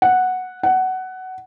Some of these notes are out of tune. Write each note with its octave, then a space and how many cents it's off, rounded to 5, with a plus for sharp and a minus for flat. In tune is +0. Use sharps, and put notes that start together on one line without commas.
F#5 -5
F#5 +15